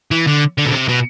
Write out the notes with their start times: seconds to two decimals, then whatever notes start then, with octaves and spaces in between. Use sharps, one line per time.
0.11 E3
0.27 D3
0.58 D3
0.66 B2
0.73 C3
0.88 B2